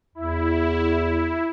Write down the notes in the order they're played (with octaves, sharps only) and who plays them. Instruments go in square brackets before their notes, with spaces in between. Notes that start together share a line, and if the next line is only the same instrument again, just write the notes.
[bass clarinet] E2 [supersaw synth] E4